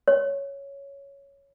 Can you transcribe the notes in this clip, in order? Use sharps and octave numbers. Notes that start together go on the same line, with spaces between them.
C#5